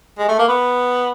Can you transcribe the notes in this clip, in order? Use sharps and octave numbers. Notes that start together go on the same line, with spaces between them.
G#3
A3
A#3
B3